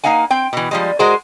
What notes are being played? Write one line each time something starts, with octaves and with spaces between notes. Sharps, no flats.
A#3 D#4 F5 F#5 G#5
C4 G5
B2 E3
F3 G3 G#3
G#3 F#4 G#4 A#4 C5